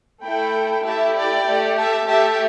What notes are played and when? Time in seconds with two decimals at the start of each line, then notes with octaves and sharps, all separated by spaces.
0.23 A3 E4 A4 G5 B5
0.84 A3 E4 G4 E5 A5
1.16 D5 G5
1.46 A3 G4
1.78 E5 A5
2.08 A3 G4 E5 A5